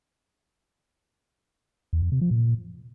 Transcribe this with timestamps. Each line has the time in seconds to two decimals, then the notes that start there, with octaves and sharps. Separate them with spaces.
1.93 E2
2.02 F2
2.12 C3
2.21 F3
2.31 A#2